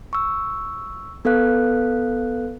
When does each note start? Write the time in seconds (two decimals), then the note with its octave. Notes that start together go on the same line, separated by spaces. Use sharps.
0.13 C#6 E6
1.25 B3 A4 B4 F5 F#6